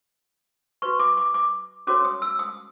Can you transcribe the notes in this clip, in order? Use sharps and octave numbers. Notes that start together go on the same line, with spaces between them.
F#4 B4 C#6
D6
D6
D6
C#4 F#4 A#4 C#5 D6
D#6
E6
D#6